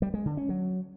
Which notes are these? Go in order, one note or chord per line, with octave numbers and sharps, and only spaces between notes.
G3
G#3
D3
C#4
F#3